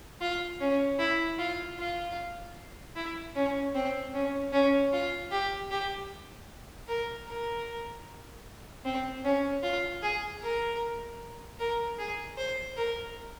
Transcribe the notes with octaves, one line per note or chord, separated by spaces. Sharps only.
F4
C#4
E4
F4
F4
E4
C#4
C4
C#4
C#4
F4
G4
G4
A#4
A#4
C4
C#4
F4
G#4
A#4
A#4
G#4
C5
A#4